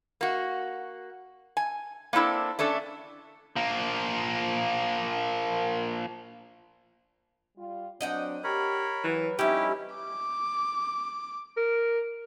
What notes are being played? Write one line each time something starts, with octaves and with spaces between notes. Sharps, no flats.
A#3 F#4
G#5
A#3 C4 D4 E4 A4
A3 C#4 D4 A4
F3 A#3
G3 F4
F#3 C4 D4 D#5 F#5 G5
G4 A#4 C#5 B5
E3 F#3 B4
F2 G3 C#4 D#4 E4 G4 E5
D6
A#4